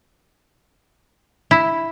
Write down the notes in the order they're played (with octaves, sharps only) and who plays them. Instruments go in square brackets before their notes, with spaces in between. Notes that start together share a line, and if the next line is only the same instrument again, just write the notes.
[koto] E4